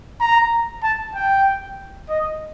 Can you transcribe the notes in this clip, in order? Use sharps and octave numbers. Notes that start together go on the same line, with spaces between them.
A#5
A5
G5
D#5